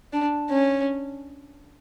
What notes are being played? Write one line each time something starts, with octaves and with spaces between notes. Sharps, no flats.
D4
C#4